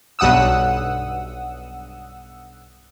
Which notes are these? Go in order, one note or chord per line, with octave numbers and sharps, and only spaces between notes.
B1 G2 F#5 D#6 E6